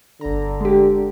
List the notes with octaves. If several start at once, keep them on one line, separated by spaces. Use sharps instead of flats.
G1 D3 A#5
G#3 G4